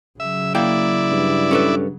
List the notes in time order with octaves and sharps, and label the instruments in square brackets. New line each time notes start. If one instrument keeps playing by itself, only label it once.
[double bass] C#3 F#3 [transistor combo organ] E5
[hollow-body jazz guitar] A#3 G5 [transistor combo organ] E4 D5
[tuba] G2
[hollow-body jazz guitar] C#4 A4 B4